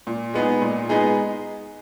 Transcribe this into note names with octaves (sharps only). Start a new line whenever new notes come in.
A#2
G#3 B3 D#4 G#4
A#2
G#3 B3 D#4 G#4